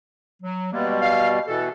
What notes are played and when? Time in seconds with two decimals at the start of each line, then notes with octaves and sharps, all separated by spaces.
0.43 F#3
0.73 B2 G3 G#3 A#3
1.01 F5
1.48 B2 E3 A4